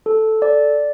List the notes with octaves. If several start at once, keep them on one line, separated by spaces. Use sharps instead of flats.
A4
D5